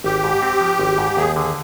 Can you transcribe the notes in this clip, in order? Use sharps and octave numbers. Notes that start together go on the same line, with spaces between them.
G#1 G4
G#2
C4
F3
G#1
G#2
D#2 G#4
D3 G#4